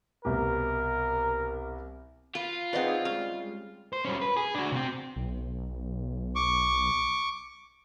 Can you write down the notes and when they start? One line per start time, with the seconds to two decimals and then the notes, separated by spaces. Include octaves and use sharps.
0.25 C2 B2 G4 A#4
2.35 F4 B4
2.73 C4 D4 D#4 G#4 B4 D5 D#5 F#5
3.05 C#3 G3 G#3 F5
3.93 C5
4.05 G3 C#4
4.21 B4
4.37 G#4
4.55 D4 F#4
4.72 C3 C4
5.16 B1
6.36 C#6 D6